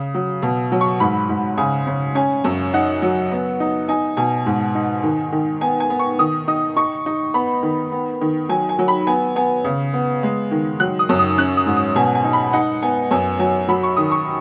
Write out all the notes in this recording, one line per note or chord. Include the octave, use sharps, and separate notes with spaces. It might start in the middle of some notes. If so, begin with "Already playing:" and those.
Already playing: C#3
F#3
B2
F#3
C#6
G#2 B5
G#2
C#3 G#5
C#3
C#4 G#5
F#2
D#4 F#5
F#3
B3
D#4
D#4 G#5
B2 G#5
G#2
D#4
D#3
D#3
B3 G#5
G#5
B3
C#6
D#3 D#6
D#4 D#6
D#4 C#6
D#4
B3 B5
D#3
B3
D#3
F#3 G#5
G#5
F#3
B5
B3 G#5
B3 G#5
C#3
B3
G#3
D#3
F#3 F#6
D#6
F#2
D#6
C#4 F#6
D#6
G#2
D#6
B2 G#5
G#5
D#4
B5
D#4 F#5
B3 G#5
F#2 G#5
F#3 G#5
F#3 B5
C#6
D#3 D#6
C#6